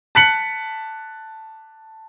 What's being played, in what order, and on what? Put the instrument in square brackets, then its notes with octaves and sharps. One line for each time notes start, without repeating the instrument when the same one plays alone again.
[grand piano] A5 F#6 B6 C#7 F#7